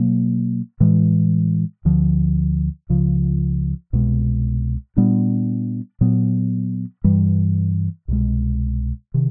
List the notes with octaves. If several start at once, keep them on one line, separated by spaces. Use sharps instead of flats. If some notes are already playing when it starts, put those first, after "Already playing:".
Already playing: B2 F#3 A#3
A2 E3 G#3
D2 D3 F3
C#2 C#3 F3
C2 B2 G#3
A#2 G3 B3 D4
A#2 F#3 B3
G2 E3 G3
C2 B2 G#3
C3 D#3